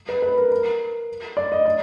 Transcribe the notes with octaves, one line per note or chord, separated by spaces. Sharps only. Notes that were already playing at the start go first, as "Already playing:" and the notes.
B4
B4
A#4
A#4
D5
D#5
D5